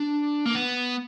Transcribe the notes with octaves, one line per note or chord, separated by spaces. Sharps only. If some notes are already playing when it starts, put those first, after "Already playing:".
Already playing: D4
A#3
B3